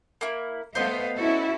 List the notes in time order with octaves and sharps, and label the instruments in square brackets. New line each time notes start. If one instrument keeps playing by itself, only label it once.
[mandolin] A#3 E4
[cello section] A3 B3 F5 [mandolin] C5 D#5
[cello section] C#4 F#4 A4 [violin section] E4 E5